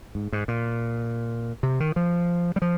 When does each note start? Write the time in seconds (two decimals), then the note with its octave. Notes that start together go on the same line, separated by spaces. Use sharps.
0.15 G#2
0.33 G#2
0.48 A#2
1.63 C3
1.80 D#3
1.96 F3
2.56 G3
2.62 F3